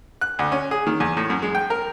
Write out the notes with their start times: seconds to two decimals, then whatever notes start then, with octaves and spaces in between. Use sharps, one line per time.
0.21 F#6
0.39 D2
0.52 C#4
0.71 G#4
0.87 D#3
1.00 E2
1.17 A2
1.30 F#2
1.42 G#3
1.55 G5
1.70 A#4